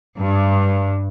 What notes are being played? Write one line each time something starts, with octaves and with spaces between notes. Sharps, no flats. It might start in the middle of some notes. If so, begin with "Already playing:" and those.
G2